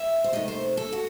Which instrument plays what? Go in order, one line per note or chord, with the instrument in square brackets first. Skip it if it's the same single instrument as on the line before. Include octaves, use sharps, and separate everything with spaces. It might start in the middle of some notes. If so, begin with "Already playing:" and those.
Already playing: [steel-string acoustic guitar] E5
C5
C3 D#3 A3 D#5
C5
A4
F#4